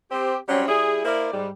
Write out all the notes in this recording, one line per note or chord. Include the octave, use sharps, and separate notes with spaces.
C4 G4
F#3 G3 C4 C#4
G3 E4 G#4
A#3 E4 A#4 C5 D5
G#2 G3